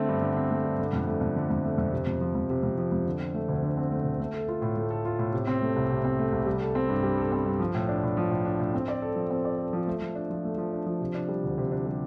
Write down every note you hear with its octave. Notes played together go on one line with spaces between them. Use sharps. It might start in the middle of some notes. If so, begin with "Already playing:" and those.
Already playing: D3 A3 C4
G2
D3
C4
A3
G2
D3
F2
A3
F2
D3
F2
A3
F2
C3
F2
F3
F2
C3
F2
F3
F2
D3
C4
A3
D2
D3
C4
A3
D2
A3
A4
F4
A2
A3
A4
F4
A2
C3
C4
A3
C2
C3
C4
A3
C2
G3
A4
C4
G2
G3
A4
C4
G2
F3
A2
D4
A2
F3
A2
D4
A2
C4
D5
A4
F3
C4
D5
A4
F3
A3
F3
D4
F3
A3
F3
D4
F3
C3
D4
G3
D2
C3
D4
G3